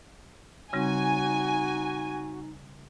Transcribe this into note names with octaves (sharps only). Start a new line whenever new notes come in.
C#3 G3 C4 D#4 F#4 G#5